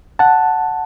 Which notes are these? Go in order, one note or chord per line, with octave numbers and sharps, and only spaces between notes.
F#5 A5